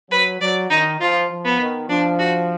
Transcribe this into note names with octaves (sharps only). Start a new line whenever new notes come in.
F#3 B4
F#3 D5
D#3 D#4
F3 F4
F3
B3
D#3
F3 D4
F#4